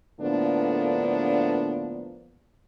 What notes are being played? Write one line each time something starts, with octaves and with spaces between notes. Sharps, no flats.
A2 D3 F3 A#3 B3 D4